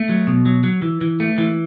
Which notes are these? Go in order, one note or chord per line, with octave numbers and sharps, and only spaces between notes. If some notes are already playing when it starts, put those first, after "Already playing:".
Already playing: A3
F#3
B2
F#3
F#3
E3
E3
A3
E3